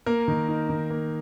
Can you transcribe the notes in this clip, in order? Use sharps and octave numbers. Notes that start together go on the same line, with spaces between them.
A#3 A#4
D#3
D#4
D#3
A#3